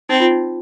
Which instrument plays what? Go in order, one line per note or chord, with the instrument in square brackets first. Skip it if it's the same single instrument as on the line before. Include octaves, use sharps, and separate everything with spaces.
[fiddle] C4 [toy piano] D#4
[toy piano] F4
D#4